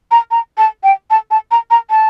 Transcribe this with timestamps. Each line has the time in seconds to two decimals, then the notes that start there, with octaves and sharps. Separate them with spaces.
0.11 A#5
0.31 A#5
0.58 A5
0.84 G5
1.10 A5
1.31 A5
1.51 A#5
1.71 A#5
1.90 A5